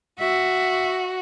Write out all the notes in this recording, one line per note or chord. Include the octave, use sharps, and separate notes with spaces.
F#4 E5